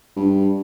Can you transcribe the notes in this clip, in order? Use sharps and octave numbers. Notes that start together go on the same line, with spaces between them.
G2